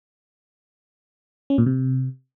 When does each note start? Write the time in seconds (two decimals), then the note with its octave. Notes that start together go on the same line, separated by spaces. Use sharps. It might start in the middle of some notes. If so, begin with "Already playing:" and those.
1.50 C#4
1.58 A#2
1.66 C3